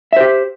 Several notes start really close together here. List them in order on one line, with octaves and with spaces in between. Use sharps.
E5 C5 G4